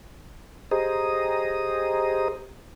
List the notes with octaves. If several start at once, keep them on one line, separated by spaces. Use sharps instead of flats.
G4 G#4 C5 D#5 A#5 D#6